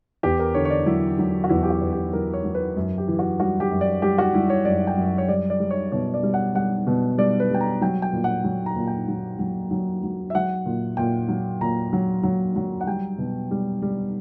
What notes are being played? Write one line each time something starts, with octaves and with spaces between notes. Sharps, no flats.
E2 G4
A#4
D3 C#5
C#5
D5
F#3 E4
F#3
F#4
E2 E4
G4
F#4
E2
G4
F#3 A#4
C#5
F#3
B4
F#2
G4
E3
F#4
G3 F#4
G4
F#2
D5
G3 G4
F#4
G3 E4
C#5
F#2 D5
G5
F#2
C#5
G3 D5
D5
G3
C#5
B2 C#5
D5
G3
F#5
G3 F#5
B2
G3 D5
B4
G3 G5
A#5
F#3 G5
G5
A#2
F#5
F#3
A#5
A#2
G5
F#3
F#3
F#3
F#3
E5
F#3 F#5
A#2
A#2 G5
F#3
A#2 A#5
F#3
F#3
F#3
F#5
G3 G5
B2
G3
G3